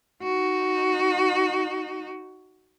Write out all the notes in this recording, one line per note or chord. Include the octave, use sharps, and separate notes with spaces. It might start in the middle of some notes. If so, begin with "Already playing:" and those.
D#4 F#4